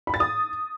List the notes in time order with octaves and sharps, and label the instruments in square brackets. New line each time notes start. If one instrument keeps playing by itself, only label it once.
[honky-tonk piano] B5
A6
D#6